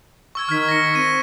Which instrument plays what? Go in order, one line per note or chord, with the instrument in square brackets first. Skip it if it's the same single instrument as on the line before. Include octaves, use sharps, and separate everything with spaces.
[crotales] C#6 E6 G#6
[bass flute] D#3 [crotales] F6 G#6 B6
[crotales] A#6 C#7
[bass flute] C4 [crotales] A#6 D#7